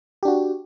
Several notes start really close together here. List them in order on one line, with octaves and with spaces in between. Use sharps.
G4 D4 F#4